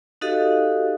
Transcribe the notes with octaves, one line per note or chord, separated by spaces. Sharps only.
D#4 F#4 G4 A4 D#5 F5